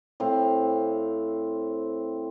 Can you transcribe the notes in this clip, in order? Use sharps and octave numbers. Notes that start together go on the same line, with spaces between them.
A2 C4 F5